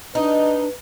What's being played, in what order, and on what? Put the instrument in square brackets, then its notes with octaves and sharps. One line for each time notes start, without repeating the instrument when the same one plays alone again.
[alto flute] D4 [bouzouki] D#4 [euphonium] B4